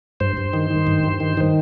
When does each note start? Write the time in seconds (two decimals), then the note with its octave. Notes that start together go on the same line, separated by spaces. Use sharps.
0.20 G2 C5
0.37 G2
0.53 D#3
0.70 D#3
0.87 G2
1.04 G2
1.20 D#3
1.37 D#3